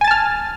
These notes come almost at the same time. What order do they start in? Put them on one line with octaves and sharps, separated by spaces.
G#5 A6 A5 F6